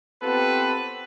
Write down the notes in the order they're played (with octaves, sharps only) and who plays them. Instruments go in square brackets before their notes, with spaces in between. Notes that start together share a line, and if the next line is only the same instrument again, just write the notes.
[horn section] B3 C4 F4 G4 A4 B4